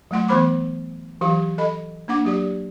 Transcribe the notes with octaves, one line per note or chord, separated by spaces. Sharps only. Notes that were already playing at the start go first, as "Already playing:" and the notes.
F#3 A3 F#5 C6
E3 B3 C5 B5 D6
E3 F#3 G4 F5
A4 D#5 B5
A#3 D4 F#5 D6
F#3 G4 D5